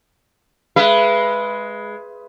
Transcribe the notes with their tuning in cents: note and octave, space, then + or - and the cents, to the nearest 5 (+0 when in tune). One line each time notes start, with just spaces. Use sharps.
G#3 +10 B4 +0 E5 +45